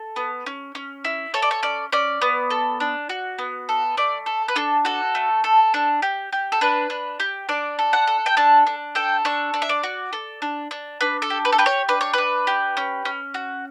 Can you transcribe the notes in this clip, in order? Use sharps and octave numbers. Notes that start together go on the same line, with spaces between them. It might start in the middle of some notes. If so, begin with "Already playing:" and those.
Already playing: A4
B3
C#4
C#4
E4
A4 C#5
D5
C#5
C#4 D5
C#4 D5
B3
A4
D4
F#4
B3
A4
A3 D5
A4
B4
D4 A4
F#4 A4
A3
A4
D4
G4
G4
A4
D4 B4
D4
G4
D4 D5
A4
F#5
A4
G5
D4 A5
D4
A4 G5
D4 C#6
D4
E5
D5
F#4
A4
D4
D4
D4 B4
A4
G4
B4
A4
G4 B4
C#5
D4 B4
C#5
D4 B4
G4
C#4
C#4
F#4